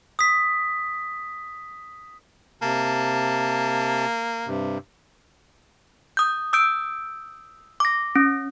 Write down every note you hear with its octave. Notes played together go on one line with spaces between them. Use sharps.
D#6 B6
C3 A#3 A5
G2 C3
D#6 G6
D#6 E6 G6 D7
D6 A#6
C#4